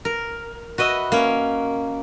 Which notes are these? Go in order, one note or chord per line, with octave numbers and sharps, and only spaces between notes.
A#4
F#4 B4 D#5 E5
A#3 C#4